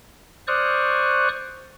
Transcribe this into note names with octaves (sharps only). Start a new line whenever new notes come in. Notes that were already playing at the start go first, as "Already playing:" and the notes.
C5 D5 C#6 D#6 F6 F#6